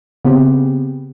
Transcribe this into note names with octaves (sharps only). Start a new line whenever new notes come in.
C#3 B3 C4 G4